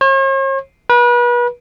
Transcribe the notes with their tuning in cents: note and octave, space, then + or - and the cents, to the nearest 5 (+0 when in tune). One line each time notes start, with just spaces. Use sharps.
C#5 -45
B4 -35